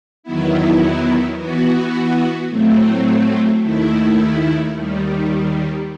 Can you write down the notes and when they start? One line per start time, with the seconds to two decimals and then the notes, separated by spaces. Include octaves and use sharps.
0.23 E2 D#3 F#3 B3 E4
1.36 E3 B3 F#4
2.49 A2 F#3 A3 C4
3.62 D#2 D#3 A3 E4
4.74 D#2 D#3 G3